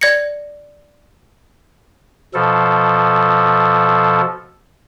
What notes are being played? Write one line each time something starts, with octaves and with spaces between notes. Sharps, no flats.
D5 G#6 A#6 C#7
B2 F3 A4